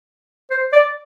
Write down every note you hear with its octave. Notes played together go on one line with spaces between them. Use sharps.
C5
D5